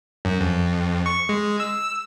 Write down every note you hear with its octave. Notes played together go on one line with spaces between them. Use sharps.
F#2
F2
C#6
G#3
E6